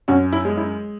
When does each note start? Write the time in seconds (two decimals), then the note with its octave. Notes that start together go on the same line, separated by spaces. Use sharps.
0.08 F#2 C#4 F#4
0.33 E4
0.45 G#3
0.57 E4